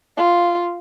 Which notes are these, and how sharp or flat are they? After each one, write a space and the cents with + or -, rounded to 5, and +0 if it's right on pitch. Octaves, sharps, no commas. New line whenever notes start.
F4 -5